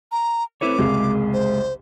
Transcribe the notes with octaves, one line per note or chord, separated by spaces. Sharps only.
A#5
A3 C4 E4 B4 C#5 D6
F#1 C2 G#3 G#4 F5
C5